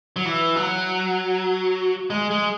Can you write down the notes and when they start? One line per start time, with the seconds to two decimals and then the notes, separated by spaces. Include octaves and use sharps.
0.16 F#3
0.25 E3
0.56 F#3
2.10 G#3
2.31 G#3